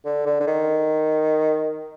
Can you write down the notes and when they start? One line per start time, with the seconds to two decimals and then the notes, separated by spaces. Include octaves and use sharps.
0.05 D3
0.26 D3
0.40 D3
0.47 D#3